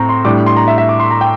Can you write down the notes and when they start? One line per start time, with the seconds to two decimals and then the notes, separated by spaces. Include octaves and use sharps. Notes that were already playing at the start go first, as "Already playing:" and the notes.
Already playing: A2 C4 A#5
0.09 C6
0.25 A2 G3 D4 D6
0.46 C6
0.56 A#5
0.68 E5
0.78 E5
0.89 D6
1.00 C6
1.10 A#5
1.21 G5